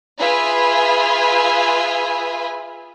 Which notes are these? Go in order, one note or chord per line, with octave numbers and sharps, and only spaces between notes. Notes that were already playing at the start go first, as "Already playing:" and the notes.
F4 G#4 B4 E5 G#5 B5